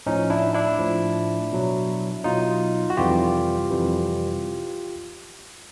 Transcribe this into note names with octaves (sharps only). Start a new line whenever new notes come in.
A2 F3 C#4 D#4
D4 E4
D4 E4
A2 F3
B2 F#3
B2 F#3 D#4 F4
F#4
F2 C3 E3 G3 F4 G4
F2 C3 E3 G3